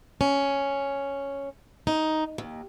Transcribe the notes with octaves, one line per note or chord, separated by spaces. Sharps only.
C#4
D#4
D#2